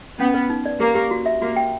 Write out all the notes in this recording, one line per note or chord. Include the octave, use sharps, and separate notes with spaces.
B3 C#4
B4
D#4
D5
A#3 G4
G4
F#4
E5
A#3 F#4
G5